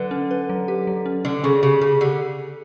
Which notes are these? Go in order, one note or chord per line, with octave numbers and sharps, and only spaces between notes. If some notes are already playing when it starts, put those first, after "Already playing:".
Already playing: D3 F#3 B4
C#4
B4
F#3
G4
F#3
C#4
D3 C#4
C#3 C#4
C#3 G4
C#3 G4
D3 G4